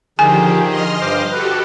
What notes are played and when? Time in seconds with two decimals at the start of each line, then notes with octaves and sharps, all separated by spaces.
0.19 D3 D#3 F3 G4 G#4 G#5
0.68 D#5 C6 F6
1.01 G2 C5 D6
1.31 F#4 G4 A4 B4